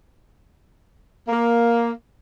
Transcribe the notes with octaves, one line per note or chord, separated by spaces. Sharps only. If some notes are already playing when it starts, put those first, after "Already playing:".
A#3